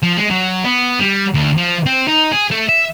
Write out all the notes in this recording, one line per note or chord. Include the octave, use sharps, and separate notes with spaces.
F3
G#3
F#3
B3
G3
D2
F3
C4
D#4
G#4
A3
E5